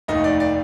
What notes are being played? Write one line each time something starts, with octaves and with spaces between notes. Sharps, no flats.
F1 D#2 D#3 A3 D#5
D5
D5